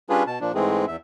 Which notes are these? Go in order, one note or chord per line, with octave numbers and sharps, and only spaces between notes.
G3 C#4 D4 F4 G#4 B4
B2 A5
A#2 F3 D4
G#2 E3 G#3 A3 C4 G#4
E2 E5